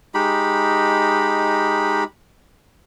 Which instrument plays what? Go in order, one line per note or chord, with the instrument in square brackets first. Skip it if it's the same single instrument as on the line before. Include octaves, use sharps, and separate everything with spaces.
[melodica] G#3 D#4 G4 B5